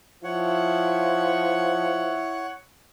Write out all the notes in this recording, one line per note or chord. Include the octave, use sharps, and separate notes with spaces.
F3 E4 C#5 F#5